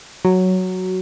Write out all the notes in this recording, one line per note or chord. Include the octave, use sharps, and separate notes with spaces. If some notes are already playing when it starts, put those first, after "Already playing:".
F#3